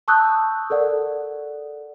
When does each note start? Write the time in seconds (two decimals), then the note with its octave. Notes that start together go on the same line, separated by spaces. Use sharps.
0.08 A5 C#6 D#6 E6 F#6 G6
0.70 A4 A#4 D5 F#5